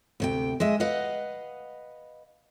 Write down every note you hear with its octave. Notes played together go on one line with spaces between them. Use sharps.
D2 C3 G5
G#3 D#5 E5
B4 D#5 F5 F#5